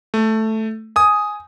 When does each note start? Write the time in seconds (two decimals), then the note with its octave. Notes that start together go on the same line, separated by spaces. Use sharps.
0.14 A3
0.96 G#5 D#6